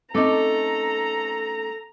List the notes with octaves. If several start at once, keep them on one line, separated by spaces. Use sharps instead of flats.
A3 C4 C#4 D#4 A4 D#5 A#5 D6